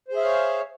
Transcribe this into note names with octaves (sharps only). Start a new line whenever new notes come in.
G#4 C5 C#5 E5 F5